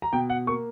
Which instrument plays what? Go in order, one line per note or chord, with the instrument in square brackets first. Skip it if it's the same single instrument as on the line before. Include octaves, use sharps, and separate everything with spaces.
[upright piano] A#5
B2 G5
F#5
A#3 C#6